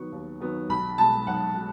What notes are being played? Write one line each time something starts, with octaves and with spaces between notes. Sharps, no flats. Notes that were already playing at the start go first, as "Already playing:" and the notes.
Already playing: D#3 F#3 B3 C#6
D#2
D#3 F#3 B3
B1 B5
B2 G#3 A5
B1 F#5
B2 G#3